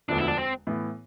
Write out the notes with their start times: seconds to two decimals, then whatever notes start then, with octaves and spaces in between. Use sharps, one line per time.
0.09 E1 D2 D3 F3 B3 D4
0.19 E4
0.28 D4
0.38 C4
0.67 A2 E3 B3